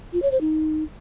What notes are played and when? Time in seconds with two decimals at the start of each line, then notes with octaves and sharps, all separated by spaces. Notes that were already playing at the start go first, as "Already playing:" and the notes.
0.13 F4
0.22 C#5
0.32 C5
0.41 D#4